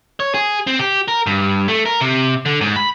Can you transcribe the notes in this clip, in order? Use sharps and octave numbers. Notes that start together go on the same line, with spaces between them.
C#5
G#4
C4
G4
A#4
G2
A3
A#4
C3
D3
G#2
B5